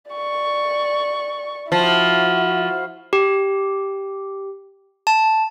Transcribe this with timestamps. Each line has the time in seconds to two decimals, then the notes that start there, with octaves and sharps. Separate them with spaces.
0.12 D5 C#6
1.72 F3 E4 F#4
3.13 G4
5.07 A5